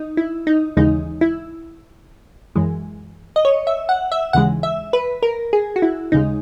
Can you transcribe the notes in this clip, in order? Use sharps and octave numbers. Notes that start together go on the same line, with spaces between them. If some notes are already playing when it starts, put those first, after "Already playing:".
Already playing: D#4
E4
D#4
D#2 C#3 E3 G#3 D#4
E4
F#2 E3 G#3
D#5
C#5
E5
F#5
E5
D#2 C#3 E3 G#3 F#5
E5
B4
A#4
G#4
F#4
E4
D#2 C#3 G#3 D#4